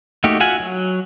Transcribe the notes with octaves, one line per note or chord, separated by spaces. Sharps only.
A3 A#3 D#4 F#4 G4
F4 F#4 E5 F#5 G#5
F#3